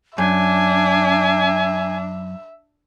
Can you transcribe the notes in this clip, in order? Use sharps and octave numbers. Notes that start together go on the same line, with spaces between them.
F#2 D4 E5 G#5